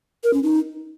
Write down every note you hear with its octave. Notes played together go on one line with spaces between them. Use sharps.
A#4
C#4
D#4